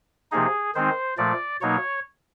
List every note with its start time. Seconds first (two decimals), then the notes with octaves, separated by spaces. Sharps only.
0.31 C3 F3 A#3 D#4 G#4
0.75 D#3 G#3 C4 D#4 C5
1.18 A#2 F3 A3 D5
1.61 B2 F#3 A#3 D#4 C#5